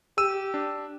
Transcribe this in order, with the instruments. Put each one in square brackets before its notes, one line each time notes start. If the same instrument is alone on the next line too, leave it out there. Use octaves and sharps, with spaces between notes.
[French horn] G4 [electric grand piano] E6 D#7
[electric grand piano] D4